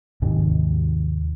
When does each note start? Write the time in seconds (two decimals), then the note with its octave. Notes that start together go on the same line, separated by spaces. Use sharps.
0.22 D#2 G#2 C3 D#3